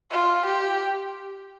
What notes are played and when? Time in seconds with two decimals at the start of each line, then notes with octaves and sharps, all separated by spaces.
0.11 F4
0.46 G4